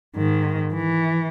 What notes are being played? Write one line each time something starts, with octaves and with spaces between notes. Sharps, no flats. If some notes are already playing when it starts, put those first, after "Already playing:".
G#2 D#3
E3